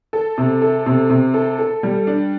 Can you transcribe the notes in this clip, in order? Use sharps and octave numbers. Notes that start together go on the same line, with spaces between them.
A4
C3
A4
C3
C3
A4
A4
G3
D4